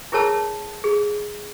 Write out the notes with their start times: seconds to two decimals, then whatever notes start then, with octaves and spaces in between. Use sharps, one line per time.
0.12 E4 G#4 A#4 C#5 A5 E6
0.84 G#4